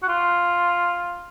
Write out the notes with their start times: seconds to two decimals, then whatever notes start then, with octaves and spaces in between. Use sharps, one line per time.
0.03 F#4
0.08 F4